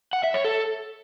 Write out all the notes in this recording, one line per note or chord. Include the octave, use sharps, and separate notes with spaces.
F#5
E5
C#5
A4